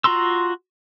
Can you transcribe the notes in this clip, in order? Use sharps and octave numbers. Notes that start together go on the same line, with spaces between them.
F4 F#4 A#5 C6 E6